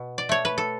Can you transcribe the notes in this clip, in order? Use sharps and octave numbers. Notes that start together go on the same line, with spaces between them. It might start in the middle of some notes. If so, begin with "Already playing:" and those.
Already playing: B2
D5
A3 C#5
B4
A4